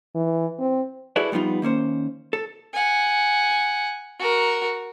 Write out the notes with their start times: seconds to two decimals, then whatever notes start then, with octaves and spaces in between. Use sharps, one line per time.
0.15 E3
0.59 C4
1.16 E4 F#4 G#4 A4 B4 D5
1.32 F3 G3 B3 D#4 F4
1.62 D#3 A#3 C#4 C5
2.33 A4
2.73 F#5 G#5
4.19 F#4 A#4